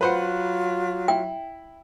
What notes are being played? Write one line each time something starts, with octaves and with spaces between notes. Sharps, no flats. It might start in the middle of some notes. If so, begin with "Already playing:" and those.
F#3 F4 B4 C5 F#5
E4 G5